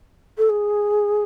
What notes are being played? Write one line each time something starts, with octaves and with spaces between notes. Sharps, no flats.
A4
G#4